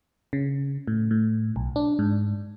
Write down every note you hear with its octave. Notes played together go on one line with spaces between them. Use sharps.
C#3
A2
A2
B1
D4
G#2